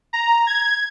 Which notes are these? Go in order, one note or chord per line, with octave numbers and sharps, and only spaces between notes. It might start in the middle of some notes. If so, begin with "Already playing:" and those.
A#5
G#6